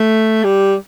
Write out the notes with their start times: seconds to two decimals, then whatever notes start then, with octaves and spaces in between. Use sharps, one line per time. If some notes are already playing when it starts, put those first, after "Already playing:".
Already playing: A3
0.44 G3